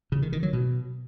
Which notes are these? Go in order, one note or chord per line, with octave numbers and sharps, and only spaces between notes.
C#3
D#3
D#3
F#3
B2